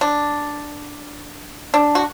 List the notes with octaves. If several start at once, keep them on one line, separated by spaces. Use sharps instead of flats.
D4
D4
F#4